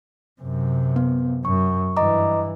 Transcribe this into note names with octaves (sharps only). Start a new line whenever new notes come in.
F#2 C3
B3
F#2 C#6
G2 E3 D#5 A#5 D6